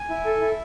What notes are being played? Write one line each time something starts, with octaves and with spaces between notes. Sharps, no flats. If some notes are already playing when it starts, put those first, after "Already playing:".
Already playing: G#5
E4
A4
E4